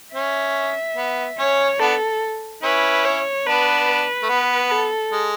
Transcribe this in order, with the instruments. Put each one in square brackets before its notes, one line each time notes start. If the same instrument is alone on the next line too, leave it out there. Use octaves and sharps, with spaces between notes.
[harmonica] C#4 [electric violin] E5
[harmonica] B3
[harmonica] C#4 [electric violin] C#5
[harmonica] B3 D4 [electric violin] A4
[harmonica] C#4 E4 [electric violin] B4
[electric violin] C#5
[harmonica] B3 D4 [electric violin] B4
[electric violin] B4
[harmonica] A3
B3
[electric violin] A4
[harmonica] G#3